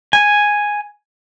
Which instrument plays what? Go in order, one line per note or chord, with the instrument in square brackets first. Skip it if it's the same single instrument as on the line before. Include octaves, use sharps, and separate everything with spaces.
[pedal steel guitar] G#5